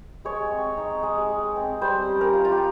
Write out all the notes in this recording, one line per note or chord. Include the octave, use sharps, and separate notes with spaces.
G#3 C#5
C4
D#4
G#3
G#3
C4
G3 C5
C#4
A#4
F4
F4
G4